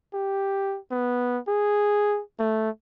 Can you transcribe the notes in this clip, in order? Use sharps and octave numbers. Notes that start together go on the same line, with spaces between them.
G4
B3
G#4
A3